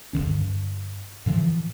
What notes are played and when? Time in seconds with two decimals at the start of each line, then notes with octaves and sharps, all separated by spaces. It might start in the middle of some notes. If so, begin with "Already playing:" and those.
0.13 E1 G#2 D#3 C#4
0.26 G2 D3
1.26 A2 D3 E3 F3